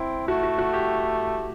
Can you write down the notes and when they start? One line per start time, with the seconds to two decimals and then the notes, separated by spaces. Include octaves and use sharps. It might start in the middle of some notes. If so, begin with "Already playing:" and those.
Already playing: C4 E4
0.28 A3 F#4
0.43 F#4
0.58 F#4
0.73 G4